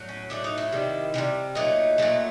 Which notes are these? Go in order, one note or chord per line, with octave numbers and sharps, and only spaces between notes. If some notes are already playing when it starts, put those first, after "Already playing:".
Already playing: A2 F#3
C#4
A2 F#3 A3 D4
D#4
E4
C3 D#3 G3
C3 D#3 G3
A#2 F#3 A3 D#4
A#2 F#3 A3